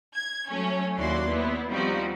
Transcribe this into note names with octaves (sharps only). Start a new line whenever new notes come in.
G#6
F#3 A3 C#4
D#2 E4 F#4 D5 C6
B3 E4
F3 G3 C4 D#4 F4 F#4